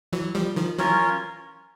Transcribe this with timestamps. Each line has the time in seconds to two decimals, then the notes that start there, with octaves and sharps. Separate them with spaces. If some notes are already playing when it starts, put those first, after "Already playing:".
0.12 E3 F#3
0.35 F3 G3
0.56 D#3 F3
0.78 E3 F#3 C#4 F4 A#4 C#5